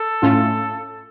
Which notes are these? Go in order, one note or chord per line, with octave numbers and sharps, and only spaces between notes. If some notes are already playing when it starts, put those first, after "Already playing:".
Already playing: A4
A2 A3 C#4 F4